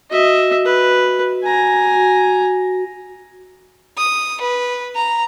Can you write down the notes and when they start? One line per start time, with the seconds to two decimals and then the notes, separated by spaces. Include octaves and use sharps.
0.11 F#4 D#5 E5
0.66 B4
1.44 G#5 A#5
1.95 F#4
3.98 D#6
4.41 B4
4.96 A#5